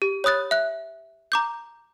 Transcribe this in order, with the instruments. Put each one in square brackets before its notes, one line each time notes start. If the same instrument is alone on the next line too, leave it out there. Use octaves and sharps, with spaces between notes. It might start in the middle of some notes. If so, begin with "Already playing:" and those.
[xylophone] G4
C#5 B5 D#6 F#6 A6
E5 F#6
A#5 D6 G6